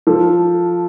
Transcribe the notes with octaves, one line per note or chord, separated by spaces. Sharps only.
F3 A4